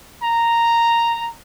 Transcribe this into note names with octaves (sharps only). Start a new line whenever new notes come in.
A#5